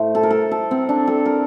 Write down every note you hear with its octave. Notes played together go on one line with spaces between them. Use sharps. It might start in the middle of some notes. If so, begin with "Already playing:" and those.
Already playing: A2 A3 C5
A4
A#4
A4
A4
C4
D4
A4
A#4